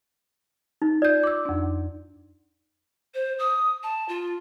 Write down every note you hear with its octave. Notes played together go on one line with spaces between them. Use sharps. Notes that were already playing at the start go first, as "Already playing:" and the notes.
D#4
F4 D5 G6
D6 E6
F2 D4
C5
D#6
A5
F4